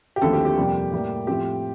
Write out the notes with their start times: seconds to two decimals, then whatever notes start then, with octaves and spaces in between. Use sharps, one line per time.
0.16 G4
0.21 D#2 D3 F3 A3 C4 A4
0.33 G4
0.45 G4
0.56 F2 C3 G3 A#3
0.92 A2 G3 A#3
1.27 A2 F3 C4 G4